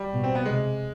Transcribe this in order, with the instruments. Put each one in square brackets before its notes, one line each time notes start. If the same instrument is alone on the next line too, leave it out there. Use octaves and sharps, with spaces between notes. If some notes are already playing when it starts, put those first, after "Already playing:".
Already playing: [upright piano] G3
[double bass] B2
[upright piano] C4
B3
[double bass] C3 [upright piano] G#3